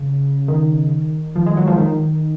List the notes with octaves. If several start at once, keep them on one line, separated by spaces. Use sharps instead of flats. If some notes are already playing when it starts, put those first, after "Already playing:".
Already playing: C#3
D#3
F3
G#3
F#3
F3
D#3